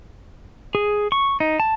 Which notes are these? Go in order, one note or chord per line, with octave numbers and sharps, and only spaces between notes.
G#4
C#6
D#4
A5